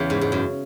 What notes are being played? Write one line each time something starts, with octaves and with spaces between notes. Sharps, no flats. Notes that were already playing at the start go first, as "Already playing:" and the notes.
Already playing: E2 C#3 E3
G#2
G#2
F#2